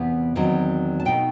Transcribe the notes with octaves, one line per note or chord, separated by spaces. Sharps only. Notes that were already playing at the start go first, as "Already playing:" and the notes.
Already playing: E2 C3 E3 B3 E5
E2 D#3 F#3 C4
A5
B2 A3 D#4 G5